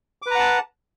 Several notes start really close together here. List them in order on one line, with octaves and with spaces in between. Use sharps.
D6 B4 A#5 F#5 A5